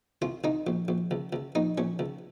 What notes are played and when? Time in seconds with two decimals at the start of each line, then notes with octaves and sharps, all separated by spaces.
0.22 C2 F4
0.44 C2 D#4
0.67 A#1
0.88 A#1
1.11 C#2
1.33 C#2
1.55 A#1 D#4
1.78 A#1 C#4
1.99 C#2